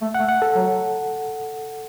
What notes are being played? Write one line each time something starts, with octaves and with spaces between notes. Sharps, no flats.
A3
F#5
A3
F#5
A4
F#3